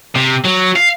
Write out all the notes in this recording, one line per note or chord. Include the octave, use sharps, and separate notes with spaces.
C3
F#3
F5